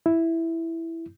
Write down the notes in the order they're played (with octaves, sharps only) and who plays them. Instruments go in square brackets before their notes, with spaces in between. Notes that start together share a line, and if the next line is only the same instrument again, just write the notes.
[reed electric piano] E4